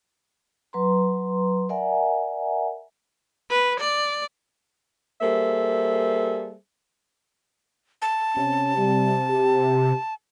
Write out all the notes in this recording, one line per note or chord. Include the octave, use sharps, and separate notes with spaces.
F#3 B4 A#5 C6
A#4 D5 E5 F#5 G#5 A#5
B4
D5
G3 A#3 G#4 A4 C5 E5
A5
C3 C#4
G3
G4